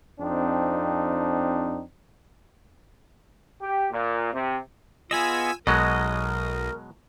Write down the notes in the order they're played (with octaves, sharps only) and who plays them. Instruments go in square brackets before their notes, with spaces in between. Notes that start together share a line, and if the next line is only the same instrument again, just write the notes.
[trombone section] F2 C4 D4 D#4
G4
A#2
C3
[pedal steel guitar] B3 G#4 D#5 [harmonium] F4 [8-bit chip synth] G#5 E6
[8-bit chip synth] B1 [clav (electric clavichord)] B2 F#3 G#3 [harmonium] A#4 [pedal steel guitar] D#5